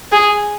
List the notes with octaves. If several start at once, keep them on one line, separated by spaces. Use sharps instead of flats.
G#4